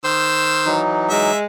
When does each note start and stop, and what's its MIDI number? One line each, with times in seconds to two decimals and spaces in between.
0.04 0.79 51
0.04 0.72 72
0.04 0.79 88
0.66 1.32 52
0.66 1.32 54
0.66 1.32 63
1.10 1.45 56
1.10 1.36 76